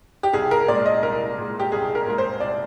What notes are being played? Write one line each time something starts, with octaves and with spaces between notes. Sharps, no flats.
G4
C2 G#4
A#4
A#2 G#3 D5
D#5
C2 A#4
A#2 G#3
G4
C2 G#4
A#4
A#2 G#3 A#4
C5
C2 D5